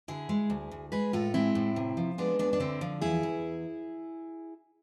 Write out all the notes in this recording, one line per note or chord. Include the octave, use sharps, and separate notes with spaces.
D3 E4 G#4
G#3
D2
D2
G#3 G#4 B4
A2 F4 A4
G#3 C4 E4
A2
C3
F3
G#3 B3 D4
D2 B3 D4
D4
D3 C4 E4
F3
E2 E4 G#4
E2